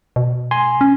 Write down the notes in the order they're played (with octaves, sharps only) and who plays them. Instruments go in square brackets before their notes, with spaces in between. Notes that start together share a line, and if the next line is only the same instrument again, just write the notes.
[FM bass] B2
[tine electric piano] G#5 C6
[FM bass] C#4